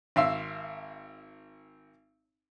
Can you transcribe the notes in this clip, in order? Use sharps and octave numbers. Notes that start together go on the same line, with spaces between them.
G#1 E5 F5 C6 E6